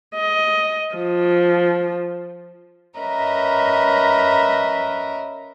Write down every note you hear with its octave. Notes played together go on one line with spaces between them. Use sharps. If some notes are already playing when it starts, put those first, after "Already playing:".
D#5
F3
C#4 A#4 B4 D#5 E5 A#5